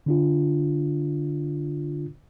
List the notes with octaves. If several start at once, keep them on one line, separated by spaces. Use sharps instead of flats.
D3 D4 F4